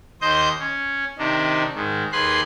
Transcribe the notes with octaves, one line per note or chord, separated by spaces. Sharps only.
D#2 C5 D#5 G6
C#4
C3 D#3 D4 D#4
G#2 D#3
D#2 G#4 B4 C6 F#6